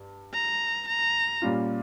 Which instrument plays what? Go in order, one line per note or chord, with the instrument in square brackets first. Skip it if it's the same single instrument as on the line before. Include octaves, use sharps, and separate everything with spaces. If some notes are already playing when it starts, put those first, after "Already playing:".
Already playing: [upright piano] G2
[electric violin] A#5
A#5
[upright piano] A#2 G3 C#4 F4